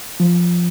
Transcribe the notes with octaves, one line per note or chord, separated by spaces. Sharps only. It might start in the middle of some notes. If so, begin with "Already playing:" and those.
F3